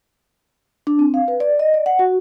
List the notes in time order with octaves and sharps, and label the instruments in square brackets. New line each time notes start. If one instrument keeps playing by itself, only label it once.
[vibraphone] D4
C4
F5
B4
D5
D#5
D5
F#5
F#4